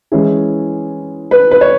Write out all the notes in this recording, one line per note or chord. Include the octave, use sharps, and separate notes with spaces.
E3 G#3 C#4 E4 G#4
B4
B4
C#5